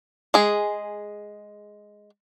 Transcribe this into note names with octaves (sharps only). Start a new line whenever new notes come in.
G#3 G#4